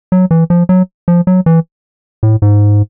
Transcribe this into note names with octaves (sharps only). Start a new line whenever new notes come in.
F#3
E3
F3
F#3
F3
F#3
E3
A2
G#2